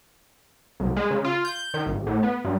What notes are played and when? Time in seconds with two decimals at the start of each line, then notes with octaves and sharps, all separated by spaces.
0.80 C2
0.97 G#3
1.11 C#3
1.24 F4
1.45 G6
1.74 D#3
1.86 G#1
2.07 A2
2.23 B3
2.44 G2